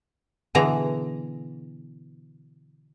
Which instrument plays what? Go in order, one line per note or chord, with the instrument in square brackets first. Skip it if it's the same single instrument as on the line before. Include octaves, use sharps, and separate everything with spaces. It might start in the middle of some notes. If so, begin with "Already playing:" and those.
[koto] B2 D3 E3 G#4 A#5